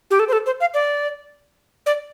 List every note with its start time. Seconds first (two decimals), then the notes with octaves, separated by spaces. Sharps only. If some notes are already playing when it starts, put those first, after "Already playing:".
0.11 G4
0.19 A4
0.28 C5
0.33 A4
0.46 C5
0.61 F5
0.74 D5
1.86 D5